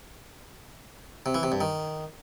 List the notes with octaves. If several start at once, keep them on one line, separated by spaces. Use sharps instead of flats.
C3
E3
C3
G2
D#3